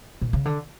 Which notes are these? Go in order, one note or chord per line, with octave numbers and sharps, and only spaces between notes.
A#2
C#3
D3